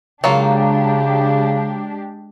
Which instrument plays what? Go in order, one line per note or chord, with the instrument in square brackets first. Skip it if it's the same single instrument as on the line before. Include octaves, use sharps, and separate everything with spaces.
[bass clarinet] C#3 [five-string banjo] F#3 A#3 F4 [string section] G#3 D4 G4